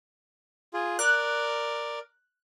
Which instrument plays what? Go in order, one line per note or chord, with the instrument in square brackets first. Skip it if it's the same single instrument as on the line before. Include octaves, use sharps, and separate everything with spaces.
[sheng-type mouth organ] F4 G#4
[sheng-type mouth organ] A#4 D5 [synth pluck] F#6